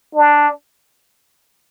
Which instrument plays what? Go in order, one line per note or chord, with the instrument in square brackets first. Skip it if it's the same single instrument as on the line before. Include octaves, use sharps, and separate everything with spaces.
[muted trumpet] D4